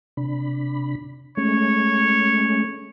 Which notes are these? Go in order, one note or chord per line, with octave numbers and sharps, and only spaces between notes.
C3 D4 B5
G#3 A3 C#4 C#5